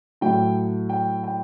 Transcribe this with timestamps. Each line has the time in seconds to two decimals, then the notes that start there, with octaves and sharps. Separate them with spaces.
0.21 A2 F#3 A3 G5
0.90 G5
1.24 G5